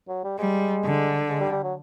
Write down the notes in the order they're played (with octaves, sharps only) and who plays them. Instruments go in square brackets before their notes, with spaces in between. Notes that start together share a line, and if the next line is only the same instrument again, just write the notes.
[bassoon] F#3
G3
[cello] G3 [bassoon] G#3
[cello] D3
[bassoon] G#3
G3
G3
F#3